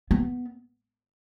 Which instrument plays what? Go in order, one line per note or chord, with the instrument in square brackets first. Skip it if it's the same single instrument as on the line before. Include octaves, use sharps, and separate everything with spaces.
[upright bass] B3